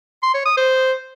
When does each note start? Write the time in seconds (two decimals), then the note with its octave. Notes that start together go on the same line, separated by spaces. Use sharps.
0.23 C6
0.34 C#5
0.46 D#6
0.57 C5